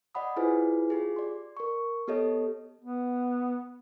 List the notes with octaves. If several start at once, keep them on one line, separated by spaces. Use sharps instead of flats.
D5 D#5 F#5 B5 D#6
E4 F4 G#4 B4 C5 G#5
F4 G4 G#4
D5 C6
A#4 C#6
B3 G4 A4 C#5 D#5
B3